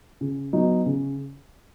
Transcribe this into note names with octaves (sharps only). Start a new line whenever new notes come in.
C#3
F#3 B3 D#4
C#3